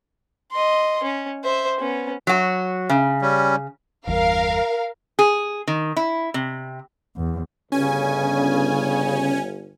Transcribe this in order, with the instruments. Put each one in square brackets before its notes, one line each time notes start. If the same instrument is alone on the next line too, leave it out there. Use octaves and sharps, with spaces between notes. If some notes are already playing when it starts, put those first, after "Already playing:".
[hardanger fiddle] D#5 C6
C#4
C5 E5
B3 C#4
[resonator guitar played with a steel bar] F#3 F#4
C#3
[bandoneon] G3 C#4
[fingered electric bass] G1 E2 G2 [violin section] A#4 F5
[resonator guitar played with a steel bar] G#4
D#3
E4
C3
[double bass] E2
[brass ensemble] G1 [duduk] C#3 [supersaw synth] C#4 G#5